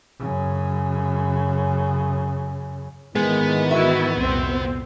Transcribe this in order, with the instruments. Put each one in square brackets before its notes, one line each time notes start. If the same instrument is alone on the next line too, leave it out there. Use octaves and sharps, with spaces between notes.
[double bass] F#2 C#3
[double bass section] G#2 D#3 E3 [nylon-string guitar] G#3 [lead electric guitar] B3
[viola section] E4 F#4 [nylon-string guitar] E5
[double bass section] C2 F2 A#2 [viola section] C4